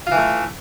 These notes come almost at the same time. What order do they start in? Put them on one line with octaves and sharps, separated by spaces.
F4 E3 A3